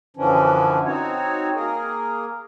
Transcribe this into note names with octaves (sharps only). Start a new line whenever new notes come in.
F#2 D3 E3 F3 C#4 D4
C4 D#4 F#4 C#5
A#3 G#4 A#4